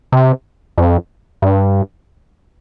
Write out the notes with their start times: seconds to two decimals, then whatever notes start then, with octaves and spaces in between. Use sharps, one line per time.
0.12 C3
0.78 F2
1.42 G2